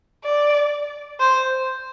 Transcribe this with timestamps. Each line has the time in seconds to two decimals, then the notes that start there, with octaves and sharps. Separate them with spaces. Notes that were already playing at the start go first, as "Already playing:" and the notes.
0.25 D5
1.20 C5